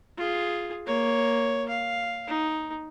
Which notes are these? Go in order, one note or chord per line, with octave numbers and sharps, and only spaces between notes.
F4 G#4
A#3 C#5
F5
D#4